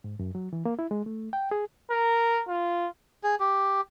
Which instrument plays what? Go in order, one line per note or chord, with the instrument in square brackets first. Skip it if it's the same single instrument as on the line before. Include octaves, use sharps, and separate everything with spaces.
[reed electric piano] G#2
F#2
F#3
E3
A#3
E4
G#3
A3
G5
G#4
[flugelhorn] A#4
F4
[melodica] G#4
G4